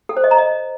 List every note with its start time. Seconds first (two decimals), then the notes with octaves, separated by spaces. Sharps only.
0.09 A4
0.17 C5
0.24 D#5
0.31 A#5
0.38 D#5